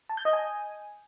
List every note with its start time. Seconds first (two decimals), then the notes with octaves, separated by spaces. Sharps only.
0.09 A5
0.17 G6
0.25 D#5
0.33 G#5